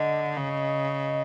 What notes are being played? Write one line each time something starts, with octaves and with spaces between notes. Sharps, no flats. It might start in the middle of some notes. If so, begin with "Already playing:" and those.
Already playing: D3 D#5
C#3